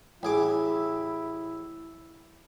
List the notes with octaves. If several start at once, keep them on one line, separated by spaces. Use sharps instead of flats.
A1 E4 G#4 D6